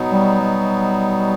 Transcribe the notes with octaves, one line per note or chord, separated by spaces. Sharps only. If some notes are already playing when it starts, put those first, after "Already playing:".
Already playing: B2 F#3 B3 D#4
G3
G3